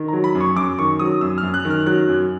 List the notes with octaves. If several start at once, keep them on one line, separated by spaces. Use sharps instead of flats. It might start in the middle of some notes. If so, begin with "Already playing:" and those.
Already playing: D#3
A#5
F#3
B5
F#2
C#6
F#2 D6
D#3 C#6
F#3 D#6
F#2 E6
F6
F#2
F#6
D#3
F6
F#3 F#6
F#2